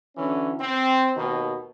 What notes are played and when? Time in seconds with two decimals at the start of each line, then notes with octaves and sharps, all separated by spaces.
0.17 D3 E3 F#3 C#4
0.60 C4
1.17 D#2 B2 D#3